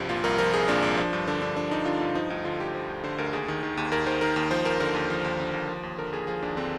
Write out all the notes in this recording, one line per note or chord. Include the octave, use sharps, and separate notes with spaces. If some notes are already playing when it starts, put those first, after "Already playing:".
Already playing: C2 G2 F3 G4
A#2 F4
C2 A#4
F3 A#4
C2 G#4
A#2 D4
C2
F3
G2
D3 D4
G2 D4
F3 D4
G2 D#4
D3 F4
G2 F4
F3 D#4
D2 D#4
D3 F4
D2 G4
F3
D2
D3 C5
D2 A#4
D#2 G#4
D#3
D#3
D#2
D#2 A#4
D#3 C5
D#3 A#4
D#2
F3 C5
D#2 A#4
D3 A#4
D#2
F3
D#2
D3
D#2
F3
D#2
D3 A#4
D#2 G#4
F3 G#4
D#2 D4
D3 C4